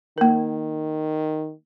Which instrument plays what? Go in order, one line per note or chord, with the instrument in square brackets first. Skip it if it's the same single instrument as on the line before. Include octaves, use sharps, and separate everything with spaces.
[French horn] D#3 [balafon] A#3 A#4